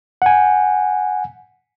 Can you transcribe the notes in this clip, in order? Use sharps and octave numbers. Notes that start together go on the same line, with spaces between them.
F#5 G#5